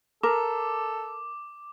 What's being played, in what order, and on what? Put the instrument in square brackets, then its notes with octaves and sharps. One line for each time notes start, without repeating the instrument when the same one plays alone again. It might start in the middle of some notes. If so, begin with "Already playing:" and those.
[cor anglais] A4 [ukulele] A#4 [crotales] D6